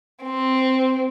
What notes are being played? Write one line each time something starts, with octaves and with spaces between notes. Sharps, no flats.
C4